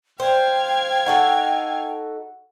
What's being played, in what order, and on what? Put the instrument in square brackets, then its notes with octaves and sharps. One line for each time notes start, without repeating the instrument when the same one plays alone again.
[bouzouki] C5 [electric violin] F5 G#6 [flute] G5
[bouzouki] D#4 F#4 A4 [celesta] F#5